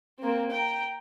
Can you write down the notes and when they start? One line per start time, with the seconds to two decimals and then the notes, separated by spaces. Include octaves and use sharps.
0.19 A#3 C4
0.51 G5 A#5